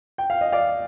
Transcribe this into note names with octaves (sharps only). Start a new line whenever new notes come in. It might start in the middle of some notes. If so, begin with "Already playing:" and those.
G5
F5
D#5
D5 F5